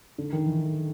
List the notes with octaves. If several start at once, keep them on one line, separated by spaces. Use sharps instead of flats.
D3
D#3
E3